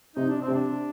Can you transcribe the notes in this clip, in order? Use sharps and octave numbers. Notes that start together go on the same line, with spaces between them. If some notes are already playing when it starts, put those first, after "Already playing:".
C3 D#4
D4
C4
C3
D4